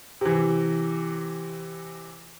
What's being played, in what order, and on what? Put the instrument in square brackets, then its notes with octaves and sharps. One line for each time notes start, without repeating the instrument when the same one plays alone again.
[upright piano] C3 E3